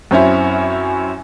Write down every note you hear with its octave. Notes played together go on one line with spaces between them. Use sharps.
F#2 C4 C#4 E4